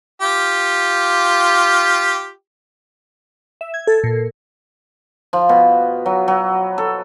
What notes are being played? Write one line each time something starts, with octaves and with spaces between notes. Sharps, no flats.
F4 G4
E5
G#6
A4
A#2
F3
B2
F#3
F#3
A4